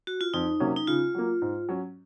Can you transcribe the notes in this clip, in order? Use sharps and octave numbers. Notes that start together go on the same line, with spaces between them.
F#4
F4
F2 D#4
C3 F#3 A#3 C#4
D#4
C#3 F4
F#3 A#3
G#2
F#3 C#4